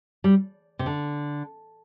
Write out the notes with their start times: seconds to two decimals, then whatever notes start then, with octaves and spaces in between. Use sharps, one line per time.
0.24 G3
0.79 C3
0.86 D3